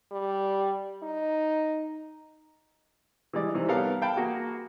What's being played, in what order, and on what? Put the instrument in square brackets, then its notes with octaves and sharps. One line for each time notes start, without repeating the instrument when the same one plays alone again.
[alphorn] G3
D#4
[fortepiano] E3 G3 G#3 D5
C3 D#3 E3
G3 B3 A4 A#4 C#5 F5
F5 G5 A5 B5
A#3 F#4 G#4